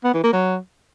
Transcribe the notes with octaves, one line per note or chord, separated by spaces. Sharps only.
B3
E3
A#3
F#3